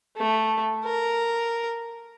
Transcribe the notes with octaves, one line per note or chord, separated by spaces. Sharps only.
A3
A#4